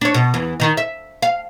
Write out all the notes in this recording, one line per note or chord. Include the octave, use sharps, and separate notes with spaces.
D4 C#5
B2
E2 E3
D#3 D#4
E5
F5